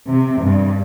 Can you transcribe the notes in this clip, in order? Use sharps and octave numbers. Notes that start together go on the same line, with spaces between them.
C3
G2